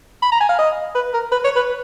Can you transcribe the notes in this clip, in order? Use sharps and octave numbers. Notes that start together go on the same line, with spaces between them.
B5
A#5
G#5
F5
D#5
B4
A#4
B4
C#5
B4